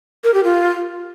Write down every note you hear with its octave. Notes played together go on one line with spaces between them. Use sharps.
A#4
G4
F4